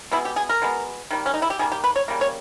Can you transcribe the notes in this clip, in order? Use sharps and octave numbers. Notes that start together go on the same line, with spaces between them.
B2 G#3 B3 E4
G4
G#4
A#4
B2 G#3 B3
D#3 G3 A#3
C#4
D#4
E4
G4
D#3 G3 A#3 G#4
G4
B4
C#5
C#3 G3 A#3
C#5